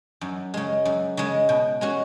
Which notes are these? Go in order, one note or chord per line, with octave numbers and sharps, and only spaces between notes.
F#2
C#3 G#3
F#2
C#3 G#3
B2
G#3 C#4 F#4